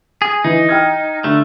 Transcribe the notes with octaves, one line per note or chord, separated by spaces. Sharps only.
G#4
E3 D#4
G5 F6 G#6
D3 A3